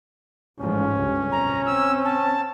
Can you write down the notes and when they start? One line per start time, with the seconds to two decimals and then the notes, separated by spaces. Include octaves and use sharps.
0.60 A1 G#2 F3 C#4
0.97 G1 C#2 G2
1.32 B1 F2 A#5
1.66 C4 E6
2.05 A5